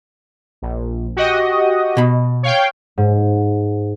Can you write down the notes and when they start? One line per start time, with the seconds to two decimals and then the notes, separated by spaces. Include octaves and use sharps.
0.62 A#1
1.16 F#4 G4 D#5
1.97 B2 B5
2.43 C#5 F5 G5
2.98 G#2